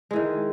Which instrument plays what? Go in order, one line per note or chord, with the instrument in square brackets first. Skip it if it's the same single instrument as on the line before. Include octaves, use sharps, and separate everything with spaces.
[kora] G#3
E3
D#3